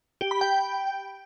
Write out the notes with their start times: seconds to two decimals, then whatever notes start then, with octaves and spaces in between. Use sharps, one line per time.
0.21 G4
0.31 B5
0.41 G5